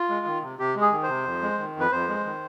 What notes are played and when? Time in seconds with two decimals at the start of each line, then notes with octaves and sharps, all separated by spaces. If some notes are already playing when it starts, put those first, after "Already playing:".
Already playing: F4
0.09 G#3
0.26 D#3
0.42 C3
0.59 C3 G4
0.75 G#3
0.81 G#4
0.92 D#3
1.03 C5
1.08 C3
1.25 F2
1.42 G#3
1.59 D#3
1.75 F2 B4
1.91 F2 C5
2.08 G#3
2.25 D#3